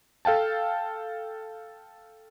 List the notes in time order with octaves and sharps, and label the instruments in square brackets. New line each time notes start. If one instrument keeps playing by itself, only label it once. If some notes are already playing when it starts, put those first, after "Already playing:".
[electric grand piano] A4 F5 G5 A5